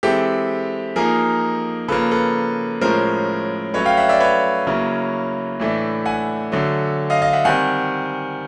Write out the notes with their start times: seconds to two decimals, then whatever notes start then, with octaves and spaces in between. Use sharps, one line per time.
0.03 E3 G#3 C4 E4 G4 A4
0.96 F3 A#3 D#4 G#4 A#4
1.88 C#3 F3 A#3 A4 B4
2.11 A4 B4
2.81 A2 F3 G#3 C#4 A#4 C5
3.74 F#3 A3 C#4 B4 C#5
3.85 F5 G5
3.97 E5 F#5
4.09 D5 E5
4.20 B4 C#5
4.67 C#3 F#3 A#3 C#4 E4
5.59 A2 E3 A3 D4
6.06 F#5 G#5
6.52 D3 F#3 A3
7.10 D#5 F5
7.22 D#5 F5
7.33 E5 F#5
7.45 D#3 G3 C4 F#5 G#5